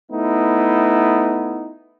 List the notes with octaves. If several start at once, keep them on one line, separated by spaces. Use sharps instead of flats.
A3 B3 D#4 E4